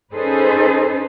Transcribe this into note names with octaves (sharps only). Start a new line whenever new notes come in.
C#4 D#4 G#4 A4 B4 C5